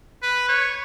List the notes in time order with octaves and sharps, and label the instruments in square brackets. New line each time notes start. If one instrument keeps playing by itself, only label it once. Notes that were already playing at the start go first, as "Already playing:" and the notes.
[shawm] B4
C#5